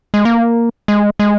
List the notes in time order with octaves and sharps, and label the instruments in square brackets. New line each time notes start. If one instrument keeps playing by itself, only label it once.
[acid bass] G#3
A#3
G#3
G#3